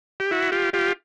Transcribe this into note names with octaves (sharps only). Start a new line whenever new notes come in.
G4
E4 F#4
F4 G4
F4 G4